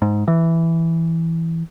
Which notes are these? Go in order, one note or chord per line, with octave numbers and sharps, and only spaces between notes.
G#2
E3